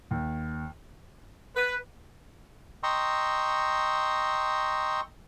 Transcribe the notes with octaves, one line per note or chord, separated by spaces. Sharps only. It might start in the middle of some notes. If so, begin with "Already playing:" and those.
D#2
B4
D#5 G5 A#5 C6 C#6 E6